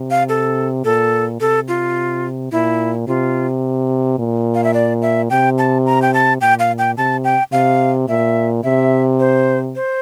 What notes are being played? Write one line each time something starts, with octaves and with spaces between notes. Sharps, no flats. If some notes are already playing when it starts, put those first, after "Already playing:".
Already playing: C3
F5
A4
A#2 A4
C3 A4
F4
A#2 E4
C3 F4
A#2
F5
E5
D5
E5
C3 G5
A5
A#5
G5
A5
A#2 G5
F5
G5
C3 A5
G5
C3 F5
A#2 E5
C3 E5
C5
C5